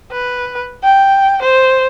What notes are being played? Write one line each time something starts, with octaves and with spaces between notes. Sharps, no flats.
B4
G5
C5